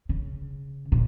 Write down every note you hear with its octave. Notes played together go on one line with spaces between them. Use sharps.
C#3
A#2